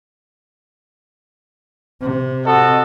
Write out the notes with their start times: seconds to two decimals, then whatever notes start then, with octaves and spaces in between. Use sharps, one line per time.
2.01 C3
2.46 F#4 A4 D#5